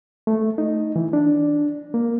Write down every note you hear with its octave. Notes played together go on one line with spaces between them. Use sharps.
A3
D#4
E3
D4
A#3